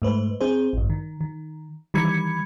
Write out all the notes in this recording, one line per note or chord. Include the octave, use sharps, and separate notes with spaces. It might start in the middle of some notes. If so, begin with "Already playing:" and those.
G#2 A3 B4 C5
C4 G#4 C5
A1 G2
D#3
D#3
D#3 E3 G3 B5 G#6 C#7